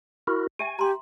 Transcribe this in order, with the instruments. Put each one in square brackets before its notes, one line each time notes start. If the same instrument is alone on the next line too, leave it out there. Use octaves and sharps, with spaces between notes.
[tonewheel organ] E4 F#4 A#4
[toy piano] G4 E5 G5 [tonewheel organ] G#5
[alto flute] G4 [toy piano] A#5 C6